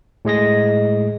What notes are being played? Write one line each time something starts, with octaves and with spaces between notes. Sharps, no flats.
A2 G#3 D#5 A#6